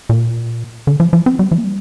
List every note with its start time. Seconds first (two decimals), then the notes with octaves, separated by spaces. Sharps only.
0.09 A#2
0.87 D3
1.00 F3
1.13 F3
1.26 C4
1.39 G3
1.51 F3
1.58 A#3
1.64 G3